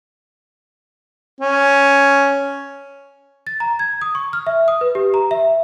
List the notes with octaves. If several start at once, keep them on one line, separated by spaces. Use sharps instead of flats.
C#4
A6
A#5
G#6
D#6
C#6
F6
E5
D#6
B4
G4
A#5
E5